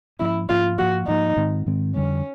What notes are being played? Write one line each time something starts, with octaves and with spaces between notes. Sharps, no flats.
G#2 F3 A#3 C#4 E4
G#2 F3 A#3 C#4 F4
G#2 F3 A#3 F#4
G#2 F3 A#3 D#4
G#2 D#3 G#3 C4
G#2 D#3 G#3 C4
F2 D3 G3 C#4